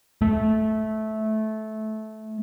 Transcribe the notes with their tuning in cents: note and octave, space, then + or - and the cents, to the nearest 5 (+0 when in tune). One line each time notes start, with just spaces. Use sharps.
A3 -15